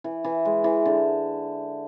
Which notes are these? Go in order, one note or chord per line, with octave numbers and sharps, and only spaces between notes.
E3
E3
G#3
E3
D3